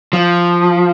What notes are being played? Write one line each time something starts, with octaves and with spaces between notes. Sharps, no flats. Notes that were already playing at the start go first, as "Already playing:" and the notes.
F3